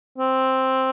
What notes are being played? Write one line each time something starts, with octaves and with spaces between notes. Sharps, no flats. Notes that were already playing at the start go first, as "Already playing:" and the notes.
C4